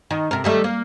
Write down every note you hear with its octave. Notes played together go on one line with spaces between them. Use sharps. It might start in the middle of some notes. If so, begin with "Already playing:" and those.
D#3
C3 A#4
D#3 G3 A3
A#3